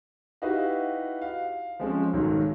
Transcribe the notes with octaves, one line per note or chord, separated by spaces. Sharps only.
D#4 E4 F#4 G4 B4 F5
F5
F3 G#3 C4 C#4
B1 G#2 D#3 F#3